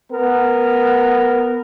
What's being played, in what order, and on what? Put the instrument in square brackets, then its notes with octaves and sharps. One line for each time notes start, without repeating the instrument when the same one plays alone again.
[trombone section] B3 A#4